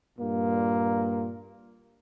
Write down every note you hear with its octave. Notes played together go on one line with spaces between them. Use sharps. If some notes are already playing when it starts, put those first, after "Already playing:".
G2 A#2 A#3